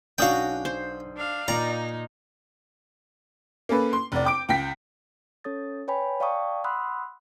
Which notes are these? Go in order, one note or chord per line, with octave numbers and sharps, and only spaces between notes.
B1 C#4 D4 F#4 D5 F5 G5 D#6
C5
D4 F5
A#2 D#4 D5 A#5
A#3 C#4 A4 B4
C6
F1 D5
G5 D6 D7
C#2 G5 B6
C#4 A4 C#5 D#6 A6
B4 C#5 G5 G#5 B5
D5 F5 G5 A5 C#6 D#6
F#5 B5 C6 D#6 E6 F#6